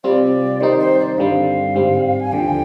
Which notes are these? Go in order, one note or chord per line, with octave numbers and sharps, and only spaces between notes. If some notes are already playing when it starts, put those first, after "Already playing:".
C3 G3 C4 F4 D5
D#3 G3 C4 D#4 C5
C5
D5
G2 D3 G3 C4 F5
G#2 G3 C4
G#5
D#2 D3 F3 G5